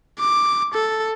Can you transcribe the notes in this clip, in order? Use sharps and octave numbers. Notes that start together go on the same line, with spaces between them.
D6
A4